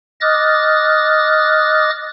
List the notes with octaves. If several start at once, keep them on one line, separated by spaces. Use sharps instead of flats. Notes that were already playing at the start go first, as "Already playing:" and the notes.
D#5 D6 D#6 F6 F#6 A6